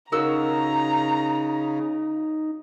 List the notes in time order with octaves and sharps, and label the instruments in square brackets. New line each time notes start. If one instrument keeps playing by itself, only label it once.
[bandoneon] C#3 [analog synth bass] D#4 [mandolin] F#4 A#4 E6 [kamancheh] A#5